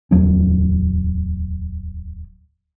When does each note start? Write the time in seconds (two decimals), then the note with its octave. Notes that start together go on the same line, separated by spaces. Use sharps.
0.11 D1 E2 F#3 C#4